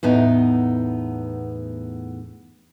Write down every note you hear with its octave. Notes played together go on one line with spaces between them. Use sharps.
E2 A2 B3 D#4